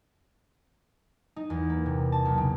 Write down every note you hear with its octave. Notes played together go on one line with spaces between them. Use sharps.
D#4
E2
A#3
C3
A5
B1
C#3